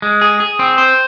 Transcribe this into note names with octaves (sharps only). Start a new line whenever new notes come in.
G#3
G#4
G#4
C4
C5